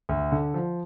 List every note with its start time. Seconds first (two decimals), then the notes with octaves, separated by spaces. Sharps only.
0.09 D2
0.32 D3
0.54 F3